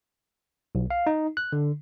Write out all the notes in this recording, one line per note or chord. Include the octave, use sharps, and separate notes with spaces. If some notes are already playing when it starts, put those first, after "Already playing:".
B1
F5
D#4
F#6
D3